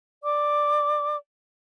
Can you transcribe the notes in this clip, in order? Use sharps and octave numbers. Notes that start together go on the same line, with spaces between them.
D5 D6